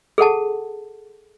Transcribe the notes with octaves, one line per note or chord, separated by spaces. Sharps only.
G#4 A4 F#5 A5